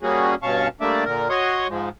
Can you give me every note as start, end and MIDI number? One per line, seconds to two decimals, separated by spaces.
0.02 0.35 55
0.02 0.35 58
0.02 0.35 61
0.02 0.35 66
0.02 0.35 68
0.43 0.68 43
0.43 0.68 47
0.43 0.68 61
0.43 0.68 77
0.43 0.68 81
0.43 0.68 85
0.81 1.04 55
0.81 1.04 57
0.81 1.04 58
0.81 1.04 62
0.81 1.04 74
0.81 1.04 76
1.05 1.28 46
1.05 1.28 50
1.05 1.28 70
1.30 1.67 66
1.30 1.67 73
1.30 1.67 75
1.30 1.67 84
1.30 1.67 85
1.30 1.67 87
1.68 1.89 44
1.68 1.89 53
1.68 1.89 56